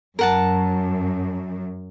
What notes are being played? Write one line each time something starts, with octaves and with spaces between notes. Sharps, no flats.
F#2 A#4 F#5 A5